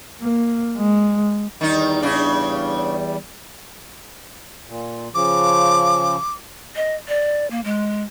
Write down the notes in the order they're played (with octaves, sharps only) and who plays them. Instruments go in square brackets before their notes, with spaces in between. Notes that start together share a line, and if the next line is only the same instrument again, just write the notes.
[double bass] A#3
G#3
[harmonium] E2 G3 [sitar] D#3 D#4
[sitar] C#3 D4
[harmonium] A#2
[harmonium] C#3 F3 [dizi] D6
[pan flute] D#5
D5
A#3
G#3